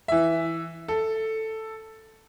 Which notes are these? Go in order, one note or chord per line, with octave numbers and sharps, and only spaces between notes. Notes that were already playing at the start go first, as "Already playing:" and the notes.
E3 E5
A4